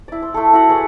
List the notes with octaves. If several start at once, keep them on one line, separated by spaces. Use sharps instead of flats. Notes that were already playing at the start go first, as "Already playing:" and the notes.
E4 D5
C6
A3 A4
E4 F#4 F#5
G#4 B4 D5 C#6